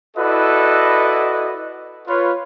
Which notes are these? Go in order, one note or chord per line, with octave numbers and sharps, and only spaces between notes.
E4 F#4 A4 B4 D5 D#5
F4 B4 C#5